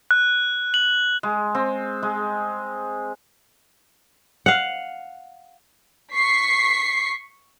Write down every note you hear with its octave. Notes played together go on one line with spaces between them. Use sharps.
F#6
F#7
G#3
C4
G#3
F5 F#5
C#6 B6 C7